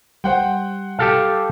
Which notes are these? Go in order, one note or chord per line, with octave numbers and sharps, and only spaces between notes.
G3 C5 F#5 G5
G4 A4 F5